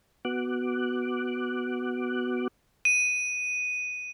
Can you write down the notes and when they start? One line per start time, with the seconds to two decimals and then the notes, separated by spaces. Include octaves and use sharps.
0.25 B3 F#4 D6 F#6
2.85 D#7